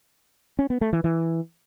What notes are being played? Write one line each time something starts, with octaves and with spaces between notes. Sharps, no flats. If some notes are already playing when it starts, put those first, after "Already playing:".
C#4
B3
A3
E3
E3